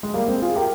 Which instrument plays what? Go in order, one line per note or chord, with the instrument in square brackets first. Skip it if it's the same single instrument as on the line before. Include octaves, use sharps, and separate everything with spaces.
[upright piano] G#3
G3 A#3
G#3 C4
F4 G#4
G4 A#4